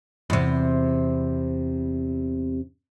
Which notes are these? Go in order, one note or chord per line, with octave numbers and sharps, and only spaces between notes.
E2 C3